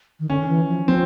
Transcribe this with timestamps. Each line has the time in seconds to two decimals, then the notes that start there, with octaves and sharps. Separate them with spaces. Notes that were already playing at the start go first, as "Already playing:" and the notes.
0.20 D#3
0.29 D3 C#4
0.40 D#3
0.48 E3
0.68 F3
0.87 F3 C4